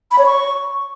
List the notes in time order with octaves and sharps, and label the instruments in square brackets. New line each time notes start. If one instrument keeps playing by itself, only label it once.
[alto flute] B5
C#5
C#6